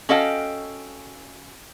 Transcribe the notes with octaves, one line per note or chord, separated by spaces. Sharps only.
C#4 F#4 A4 D#5 F5 G5